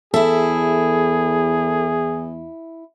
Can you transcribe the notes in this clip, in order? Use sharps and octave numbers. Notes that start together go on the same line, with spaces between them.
E2 E4 G#4 A4 E5